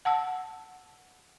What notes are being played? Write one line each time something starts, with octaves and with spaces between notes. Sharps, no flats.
F#5 A5 E6